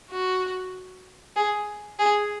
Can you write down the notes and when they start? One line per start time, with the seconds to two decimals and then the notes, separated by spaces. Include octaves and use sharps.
0.11 F#4
1.36 G#4
1.99 G#4